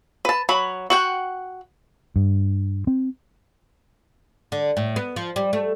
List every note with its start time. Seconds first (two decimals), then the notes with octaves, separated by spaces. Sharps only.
0.25 B4 A5
0.49 F#3 B5
0.90 F#4 F#5 G5
2.16 G2
2.87 C4
4.52 D3
4.77 A2
4.96 B3
5.16 F3
5.36 G3
5.53 A3